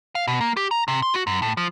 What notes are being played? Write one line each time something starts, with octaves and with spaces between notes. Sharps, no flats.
F5
B2
A#3
G4
A#5
C3
C6
F#4
F#2
A2
F3